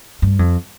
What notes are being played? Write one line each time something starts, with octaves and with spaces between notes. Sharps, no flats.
G2
F2